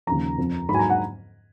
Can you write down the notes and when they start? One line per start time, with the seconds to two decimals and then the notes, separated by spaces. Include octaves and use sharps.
0.07 D#2 C#3 F3 A#5
0.38 F2 F3
0.69 G#2 B5
0.72 F#3 G#5
0.79 A#5
0.90 F#5